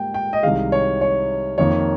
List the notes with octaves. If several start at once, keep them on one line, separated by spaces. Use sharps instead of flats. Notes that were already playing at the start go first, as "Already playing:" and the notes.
Already playing: G#2 G3 A#3 G5
G5
D#5
C2 C3 D#3 G#3 F5
C#5
C#5
F2 D#3 A#3 C#5